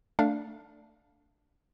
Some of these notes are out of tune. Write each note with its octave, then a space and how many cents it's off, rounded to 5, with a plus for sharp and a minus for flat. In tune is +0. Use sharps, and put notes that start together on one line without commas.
A3 +20 D4 +0 F5 +10